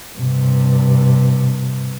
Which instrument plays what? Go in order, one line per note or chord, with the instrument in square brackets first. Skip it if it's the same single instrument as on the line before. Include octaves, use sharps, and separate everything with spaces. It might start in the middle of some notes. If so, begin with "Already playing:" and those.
[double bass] G2 C3